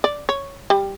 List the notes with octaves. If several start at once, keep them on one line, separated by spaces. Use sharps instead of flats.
D5
C#5
G3